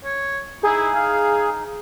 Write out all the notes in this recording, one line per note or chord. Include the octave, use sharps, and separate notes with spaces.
C#5
D#4 E4 G#4
F5